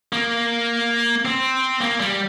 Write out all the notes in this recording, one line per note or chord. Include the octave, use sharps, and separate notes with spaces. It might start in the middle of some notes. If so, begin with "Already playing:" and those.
A#3
C4
A#3
G3